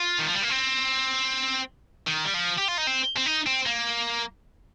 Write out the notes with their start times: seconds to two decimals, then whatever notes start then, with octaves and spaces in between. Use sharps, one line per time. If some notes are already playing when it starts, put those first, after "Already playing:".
Already playing: F4
0.19 D#3
0.28 F3
0.35 G3
0.43 A#3
0.51 C4
2.08 D#3
2.25 G3
2.35 F3
2.58 G4
2.68 F4
2.78 D#4
2.87 C4
3.17 C4
3.26 D#4
3.46 C4
3.66 A#3